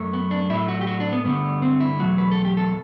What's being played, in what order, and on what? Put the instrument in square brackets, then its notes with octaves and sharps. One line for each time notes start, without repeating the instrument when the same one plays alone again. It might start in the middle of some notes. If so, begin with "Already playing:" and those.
Already playing: [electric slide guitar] F#2 F#3 A3
B3
D4
A2 F#3 A3 E4
F#4
G4
F#4
D4
B3
G2 D3 A3 B3
C4
E4
E2 B2 F#3 A3 F#4
B4
A4
G4
A4